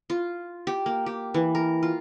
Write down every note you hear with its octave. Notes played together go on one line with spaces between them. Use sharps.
F4
G4
A#3
G4
E3
A#4
F4